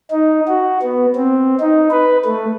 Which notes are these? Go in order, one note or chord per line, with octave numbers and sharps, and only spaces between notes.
D#4
F#4
B3
C4
D#4
B4
A3